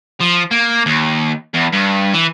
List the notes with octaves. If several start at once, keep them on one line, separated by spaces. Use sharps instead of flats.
F3
A#3
D#2
E2
G2
E3